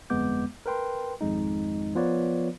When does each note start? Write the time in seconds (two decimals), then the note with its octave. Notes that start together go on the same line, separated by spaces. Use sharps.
0.10 G1 F2 G#3 B3 D6 G6
0.66 A#4 B4 G5 C6
1.21 G#1 F2 G#3 D#4
1.95 F3 B3 F4 B4 C#5 D5